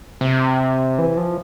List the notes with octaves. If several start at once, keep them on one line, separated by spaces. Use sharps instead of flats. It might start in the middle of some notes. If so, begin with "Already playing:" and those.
C3
E3
F3